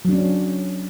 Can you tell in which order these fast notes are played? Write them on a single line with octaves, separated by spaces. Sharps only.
F#3 D4 C#4